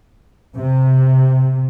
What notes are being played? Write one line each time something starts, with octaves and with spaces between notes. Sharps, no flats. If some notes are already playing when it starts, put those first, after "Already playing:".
C3